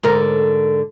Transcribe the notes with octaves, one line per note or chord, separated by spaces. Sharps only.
G#2 D3 A#4